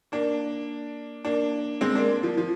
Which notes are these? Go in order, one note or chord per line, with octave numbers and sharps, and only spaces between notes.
A#3 D4
A#3 D4
G#3 C4
A#3 D4
F3
F3